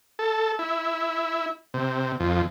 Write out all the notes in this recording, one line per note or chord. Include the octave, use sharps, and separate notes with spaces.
A4
E4
C3
F2